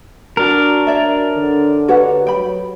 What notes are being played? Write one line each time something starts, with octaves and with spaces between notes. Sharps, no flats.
D4 F#4 A#4
C#5 D5 E5
D3
F#4 G4 B4 C#5 F#5
F#3 G5 B5